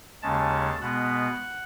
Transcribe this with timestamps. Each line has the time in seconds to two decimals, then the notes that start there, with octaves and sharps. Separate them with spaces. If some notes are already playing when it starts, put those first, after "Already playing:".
0.22 D#2 C#3 G#3 C#4 A5
0.81 B2 G#3 B3 F#5